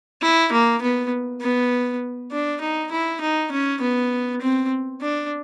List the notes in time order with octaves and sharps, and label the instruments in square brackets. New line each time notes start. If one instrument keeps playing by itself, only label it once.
[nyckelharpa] E4
A#3
B3
B3
D4
D#4
E4
D#4
C#4
B3
C4
D4